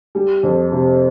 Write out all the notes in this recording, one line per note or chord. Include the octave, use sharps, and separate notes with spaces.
G3
F2
C3